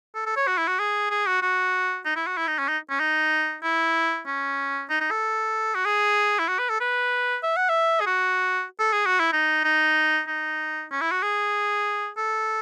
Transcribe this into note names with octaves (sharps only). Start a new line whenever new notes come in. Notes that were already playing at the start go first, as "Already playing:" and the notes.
A4
A4
C#5
F#4
E4
F#4
G#4
G#4
F#4
F#4
D#4
E4
F#4
E4
D#4
C#4
D#4
C#4
D#4
E4
C#4
D#4
D#4
A4
F#4
G#4
E4
F#4
B4
A4
B4
E5
F#5
E5
G#4
F#4
A4
G#4
F#4
E4
D#4
D#4
D#4
C#4
E4
F#4
G#4
A4